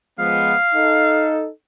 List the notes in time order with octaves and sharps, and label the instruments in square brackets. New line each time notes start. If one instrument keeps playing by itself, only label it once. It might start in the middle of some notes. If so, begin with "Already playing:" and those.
[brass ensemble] F3 G#3 B3 [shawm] F5
[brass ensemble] D#4 A4